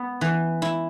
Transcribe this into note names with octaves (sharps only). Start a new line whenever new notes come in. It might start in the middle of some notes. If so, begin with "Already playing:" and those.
Already playing: B3
E3
E4